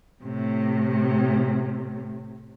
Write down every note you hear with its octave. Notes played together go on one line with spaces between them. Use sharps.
A2 C3